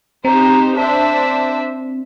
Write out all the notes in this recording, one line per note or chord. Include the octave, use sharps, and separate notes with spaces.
C4 D#4 G4 C5 A#5
D4 C5 E5 A5